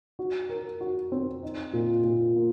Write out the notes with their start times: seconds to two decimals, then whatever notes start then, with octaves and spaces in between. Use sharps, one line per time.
0.19 F#4
0.49 A#4
0.81 F#4
1.12 C4
1.43 D#4
1.73 A#2
2.04 A#2
2.36 A#3